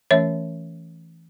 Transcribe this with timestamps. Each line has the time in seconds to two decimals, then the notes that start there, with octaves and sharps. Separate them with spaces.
0.11 E3 A3 C#4 C#5 E5